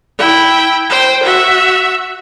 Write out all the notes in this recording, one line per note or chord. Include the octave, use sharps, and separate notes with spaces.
E4 G5
C5 G5
F#4 E5